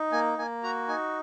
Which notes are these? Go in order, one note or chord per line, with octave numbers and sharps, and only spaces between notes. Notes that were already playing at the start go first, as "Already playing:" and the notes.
Already playing: D#4
A#3 G#5
A#3 G#5
F#4 A#5
D#4 G#5